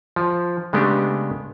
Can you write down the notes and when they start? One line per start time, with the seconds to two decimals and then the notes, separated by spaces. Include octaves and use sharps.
0.16 F3
0.73 C#3 G#3 A3 B3 D4 G4